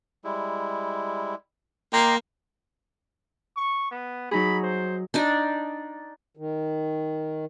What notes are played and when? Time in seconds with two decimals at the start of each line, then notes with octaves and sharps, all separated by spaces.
0.24 G3 G#3 E4
1.93 A#3 D#5 G5 A#5 C6 D6 D#6
3.56 C#6
3.91 B3
4.31 F#3 D#4 G#4 B5
4.63 C5
5.14 D4 D#4 D5
6.37 D#3